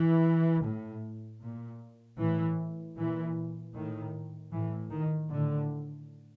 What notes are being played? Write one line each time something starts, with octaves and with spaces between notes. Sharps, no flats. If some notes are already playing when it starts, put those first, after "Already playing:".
Already playing: E3
A2
A#2
A2 E3
A#2 E3
A2 D#3
A2 E3
D#3
A2 D3